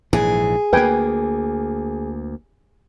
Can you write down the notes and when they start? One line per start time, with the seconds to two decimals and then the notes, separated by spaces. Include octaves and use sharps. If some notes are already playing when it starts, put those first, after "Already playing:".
0.13 A#1 G#2 E3 G#4
0.73 D2 A#3 B4 G5 G#5